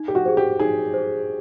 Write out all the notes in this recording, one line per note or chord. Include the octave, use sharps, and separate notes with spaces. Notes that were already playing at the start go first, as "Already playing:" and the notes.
Already playing: D#4
G4
F#4
G#4 C5
G4
D#4 G#4
G#4 C5